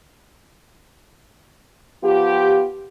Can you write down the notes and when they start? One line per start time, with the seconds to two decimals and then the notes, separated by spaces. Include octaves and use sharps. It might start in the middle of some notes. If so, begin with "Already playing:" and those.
2.03 F3 B3 F4 G4